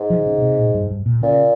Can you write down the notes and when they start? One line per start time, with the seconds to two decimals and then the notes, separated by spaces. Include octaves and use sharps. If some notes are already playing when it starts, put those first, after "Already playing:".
Already playing: G#2
0.10 F3
0.19 D#3
0.26 C#3
0.38 C#3
0.42 C3
0.59 A#2
0.74 G2
0.90 G2
1.06 A#2
1.22 A#2 C#3